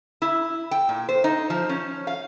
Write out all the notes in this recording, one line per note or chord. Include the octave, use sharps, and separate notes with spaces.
E4
G5
A#2
C5
D#4
F3
C#4
F5